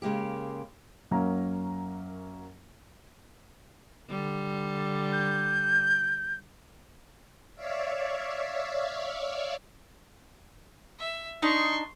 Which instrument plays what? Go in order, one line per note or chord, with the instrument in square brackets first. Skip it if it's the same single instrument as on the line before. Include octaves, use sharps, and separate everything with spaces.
[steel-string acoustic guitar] C#3 G#3 A#3 G4
[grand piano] F#2 F#3 A#3 C#4 A#5
[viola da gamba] D3 G3
[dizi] G6
[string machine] C#5 D5 E5 F5
[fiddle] E5
[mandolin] D4 D#4 [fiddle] C6 C#6